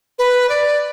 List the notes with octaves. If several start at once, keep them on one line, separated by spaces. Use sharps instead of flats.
B4
D5